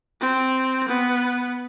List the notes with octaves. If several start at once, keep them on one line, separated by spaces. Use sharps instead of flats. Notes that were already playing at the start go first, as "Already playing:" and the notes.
C4
B3